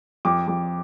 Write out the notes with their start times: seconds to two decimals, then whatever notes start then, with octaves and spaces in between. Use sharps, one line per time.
0.25 F2 D6
0.48 F2